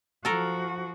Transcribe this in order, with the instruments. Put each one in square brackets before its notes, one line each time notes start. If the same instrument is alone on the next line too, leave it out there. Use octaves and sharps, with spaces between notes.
[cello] F3 F#4 [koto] A4 A#4